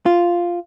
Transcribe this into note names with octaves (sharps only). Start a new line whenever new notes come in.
F4